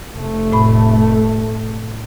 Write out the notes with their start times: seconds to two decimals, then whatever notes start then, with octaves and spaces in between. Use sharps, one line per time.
0.11 F1 A3
0.52 A2 B5